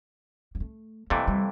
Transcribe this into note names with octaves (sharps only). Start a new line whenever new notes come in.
G3
A3
F2 C3 E3 A3 A#3
G3